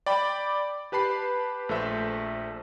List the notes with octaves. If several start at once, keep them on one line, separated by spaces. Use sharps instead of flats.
D5 G5 B5
G4 B4 A5 B5 C7
A#1 A3 A4 C5 E5